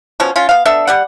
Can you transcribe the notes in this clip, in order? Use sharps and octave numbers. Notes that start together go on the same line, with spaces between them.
B2 F3 C#4
C#4 F4
B3 F5
B3 D4 A4 E5
G3 D5 F#5